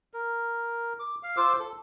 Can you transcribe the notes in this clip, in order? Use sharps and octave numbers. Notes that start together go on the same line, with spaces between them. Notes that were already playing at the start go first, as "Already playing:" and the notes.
A#4
D6
F5
F4 C5 D6 E6
A4